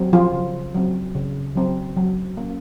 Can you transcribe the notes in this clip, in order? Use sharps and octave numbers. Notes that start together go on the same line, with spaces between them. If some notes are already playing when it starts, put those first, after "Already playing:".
Already playing: F#3 C4
F3 F4
C#3
F#3 C4
C#3
F#3 C4
F#3
A#3 C#4